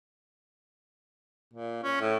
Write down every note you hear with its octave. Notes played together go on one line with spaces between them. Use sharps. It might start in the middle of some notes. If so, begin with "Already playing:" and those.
A#2
C#4
A2